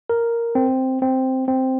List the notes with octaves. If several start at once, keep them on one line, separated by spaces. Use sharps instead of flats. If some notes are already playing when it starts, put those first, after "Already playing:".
A#4
C4
C4
C4